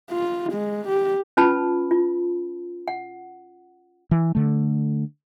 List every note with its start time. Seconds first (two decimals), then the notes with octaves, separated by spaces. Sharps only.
0.11 F4
0.53 G#3
0.88 G4
1.37 C#4 F4 B4 A5 B5
1.91 F4
2.88 F#5
4.11 E3
4.35 D3 A3